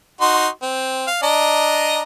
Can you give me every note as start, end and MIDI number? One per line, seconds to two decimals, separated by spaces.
0.21 0.48 63
0.21 0.48 66
0.21 0.48 84
0.62 1.06 60
1.07 1.18 77
1.23 2.03 62
1.23 2.03 75
1.23 2.03 82